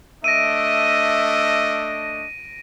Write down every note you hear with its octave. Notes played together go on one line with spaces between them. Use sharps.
A3 D4 D#5 E5 A#6 D7 D#7